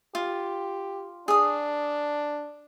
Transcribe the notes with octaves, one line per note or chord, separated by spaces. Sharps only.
F4 G4
D4 G#4 D#6